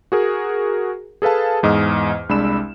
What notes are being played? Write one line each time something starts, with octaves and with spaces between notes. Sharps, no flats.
F#4 G#4 A#4
G#4 A4 B4 F5 A5
E2 G#2 D#5 D#6 F6
C2 G#3 D4 B5 E6 E7